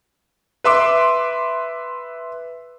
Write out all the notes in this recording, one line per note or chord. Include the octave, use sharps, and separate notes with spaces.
B4 E5 C6 D6